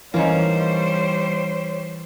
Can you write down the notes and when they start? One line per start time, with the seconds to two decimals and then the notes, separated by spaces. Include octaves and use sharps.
0.14 E3 G3 A#3 C#4 D#4 C5 C#5